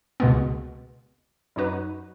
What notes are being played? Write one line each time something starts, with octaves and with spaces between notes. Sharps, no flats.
C#2 B2 G#3 B3
F#2 F#3 D#4 F#4 B4